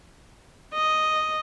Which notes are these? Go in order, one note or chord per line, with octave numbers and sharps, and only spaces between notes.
D#5